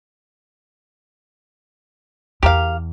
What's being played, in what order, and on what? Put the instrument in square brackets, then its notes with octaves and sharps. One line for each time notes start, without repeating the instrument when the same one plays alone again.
[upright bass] E2 [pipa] G4 A#4 F5